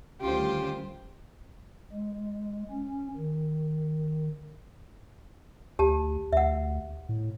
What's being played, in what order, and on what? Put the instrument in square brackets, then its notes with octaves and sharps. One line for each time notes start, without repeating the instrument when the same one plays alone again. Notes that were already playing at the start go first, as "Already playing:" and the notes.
[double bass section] D2 D#3 G3 [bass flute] C#4 [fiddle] F4 C5 [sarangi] G4
[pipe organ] G#3
C#4
D#3
[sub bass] D2 [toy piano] G4 A5
[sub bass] D2 [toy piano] E5 F#5
[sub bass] A2